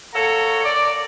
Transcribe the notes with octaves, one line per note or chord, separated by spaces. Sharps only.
A#3 A4 C#5 F#5 A#5
D5